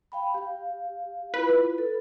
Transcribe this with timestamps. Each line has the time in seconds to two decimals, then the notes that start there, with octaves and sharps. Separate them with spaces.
0.12 F5 G5 B5
0.34 G4 F5
1.34 E4 F4 B4
1.78 A4